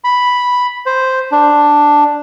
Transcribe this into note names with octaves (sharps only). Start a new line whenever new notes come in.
B5
C5
D4